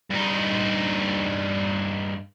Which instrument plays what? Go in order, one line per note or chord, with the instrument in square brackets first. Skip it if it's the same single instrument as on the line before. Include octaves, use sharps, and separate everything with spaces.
[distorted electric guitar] G2 D#4